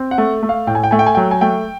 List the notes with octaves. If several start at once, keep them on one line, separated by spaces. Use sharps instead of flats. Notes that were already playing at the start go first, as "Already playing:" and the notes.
Already playing: C4
F#5
A3
A3
F5
A2 G5
G#5
G5
A3 G#5
G5
G#5
F#3 G5
G#5
A3 G5